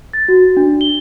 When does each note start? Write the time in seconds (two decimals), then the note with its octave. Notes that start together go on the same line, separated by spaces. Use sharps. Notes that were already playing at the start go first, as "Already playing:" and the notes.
0.13 A6
0.28 F#4
0.57 D4
0.81 G7